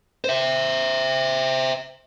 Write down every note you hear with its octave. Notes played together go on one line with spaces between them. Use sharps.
C5 E5